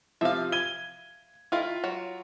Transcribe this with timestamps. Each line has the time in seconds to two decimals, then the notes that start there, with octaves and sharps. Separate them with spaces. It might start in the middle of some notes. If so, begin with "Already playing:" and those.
0.21 C3 F3 E5 F5
0.52 G#6 D#7 G7
1.52 D#3 E4 F4 F5
1.84 F#3